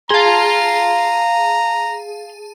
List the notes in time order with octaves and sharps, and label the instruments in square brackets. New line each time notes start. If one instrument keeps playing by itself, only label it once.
[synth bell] G#4 A5 [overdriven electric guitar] F5 C6 [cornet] A#5